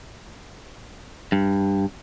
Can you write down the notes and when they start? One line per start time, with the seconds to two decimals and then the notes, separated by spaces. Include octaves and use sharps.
1.32 G2